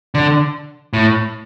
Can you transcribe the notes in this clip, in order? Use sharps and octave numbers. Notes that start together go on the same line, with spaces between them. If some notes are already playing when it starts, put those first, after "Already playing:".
D3
A2